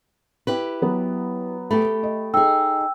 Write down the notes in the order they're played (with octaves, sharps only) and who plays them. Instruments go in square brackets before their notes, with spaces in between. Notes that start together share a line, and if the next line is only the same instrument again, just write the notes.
[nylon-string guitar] E4 G4 B4
[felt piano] F#3 B3
[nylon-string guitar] A3 G4 [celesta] B5
[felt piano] D#5
[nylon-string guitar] D#4 G#4 [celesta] G5 E6